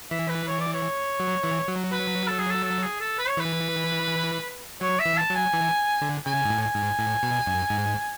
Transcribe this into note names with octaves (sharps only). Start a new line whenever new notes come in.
E3 E5
B4
C#5
D5
C#5
F#3
E3
F#3
B4
A4
G#4
A4
A4
G#4
A4
B4
C#5
E3 B4
F#3 C#5
E5
E3
A5
F#3
G#5
E3
D3
C#3 G#5
G#2
A2
G#5
G#2
A2
B2
F#2
G#2